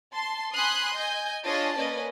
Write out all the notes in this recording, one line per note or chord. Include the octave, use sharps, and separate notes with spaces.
A5 C6
G#5 B5 C6 D#6 F#6
D#5 G#5 G6
D4 F4 G#4 C#5 D#5 A5
A#3 C#4 B4 D5 D#5